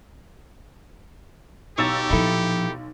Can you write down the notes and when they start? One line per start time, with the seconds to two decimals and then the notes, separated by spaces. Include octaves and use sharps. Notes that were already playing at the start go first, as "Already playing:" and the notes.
1.78 B1 G4 C#5 A5 A#5 E6 A6
2.10 A#2 F3 D#4 E4 A4